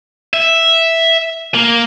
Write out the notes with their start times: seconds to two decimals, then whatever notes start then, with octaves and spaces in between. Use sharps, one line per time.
0.34 E5
1.54 A#3